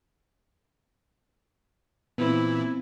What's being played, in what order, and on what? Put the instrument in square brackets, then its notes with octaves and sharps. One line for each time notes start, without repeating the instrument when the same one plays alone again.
[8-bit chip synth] A#2 E3 [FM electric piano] B3 C4 C5 [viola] E4